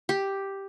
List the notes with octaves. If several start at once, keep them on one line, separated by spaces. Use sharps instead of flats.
G4